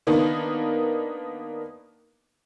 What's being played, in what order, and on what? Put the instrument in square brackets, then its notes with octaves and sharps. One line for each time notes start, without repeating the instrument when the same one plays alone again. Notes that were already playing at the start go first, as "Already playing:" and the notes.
[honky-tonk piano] D#3 A#3 B3 D4 D#4